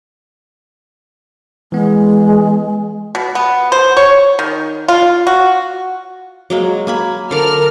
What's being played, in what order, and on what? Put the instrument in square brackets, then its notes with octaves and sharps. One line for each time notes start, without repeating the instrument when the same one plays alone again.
[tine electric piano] E3 B3 [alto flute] G#3
[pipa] B2
B3
C5
C#5
D#3
F4
F#4
[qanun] F#3 G#3 A#3
A#3 G#5 B5
[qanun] D3 D5 [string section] A#4 F6